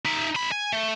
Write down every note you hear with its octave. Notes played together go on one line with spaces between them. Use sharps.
D#4 E5
D#4 B5
G#5
A3